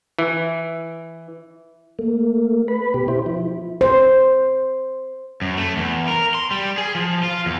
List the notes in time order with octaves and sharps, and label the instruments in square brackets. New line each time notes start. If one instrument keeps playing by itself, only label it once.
[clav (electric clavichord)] E3
[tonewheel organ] A3 A#3
B4 B5
B2 G4
E4 G4 C5
F3 E4
[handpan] C5
[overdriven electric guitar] F#2
A3
E2
A#4
C6
G3
G#4
F3
F4
E2